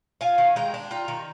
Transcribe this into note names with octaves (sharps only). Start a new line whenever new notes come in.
F4 F5 G#5
D#3
G#3 G5 A#5
D4
F4 G5 A#5
D#3